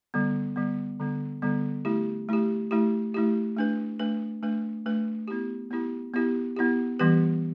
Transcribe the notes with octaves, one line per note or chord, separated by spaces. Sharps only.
D3 G3 B3
D3 G3 B3
D3 G3 B3
D3 G3 B3
A3 E4 G4
A3 E4 G4
A3 E4 G4
A3 E4 G4
A3 D4 B4
A3 D4 B4
A3 D4 B4
A3 D4 B4
B3 E4 G4
B3 E4 G4
B3 E4 G4
B3 E4 G4
E3 G3 B3 G4 B4